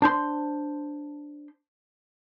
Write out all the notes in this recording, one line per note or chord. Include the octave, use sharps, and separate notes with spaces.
D4 C5 C6